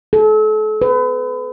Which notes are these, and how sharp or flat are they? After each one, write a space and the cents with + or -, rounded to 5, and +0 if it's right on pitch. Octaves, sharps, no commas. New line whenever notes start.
A4 -35
B4 +30